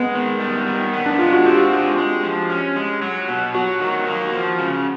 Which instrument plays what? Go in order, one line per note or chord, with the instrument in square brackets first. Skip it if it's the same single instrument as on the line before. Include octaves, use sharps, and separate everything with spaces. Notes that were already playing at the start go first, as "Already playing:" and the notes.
Already playing: [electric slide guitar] G#3 [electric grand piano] B3
[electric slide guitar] D#3
G3
D#3
B3
[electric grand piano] D4
[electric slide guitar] G#3 [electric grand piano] F4
[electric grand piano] F#4
[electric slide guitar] C4 [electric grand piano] G4
[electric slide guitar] G#3
G#3
F3
C#4
G#3
F#3
B2
[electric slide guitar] F#3 [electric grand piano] F#4
[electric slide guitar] D#3
A#3
F3
C#3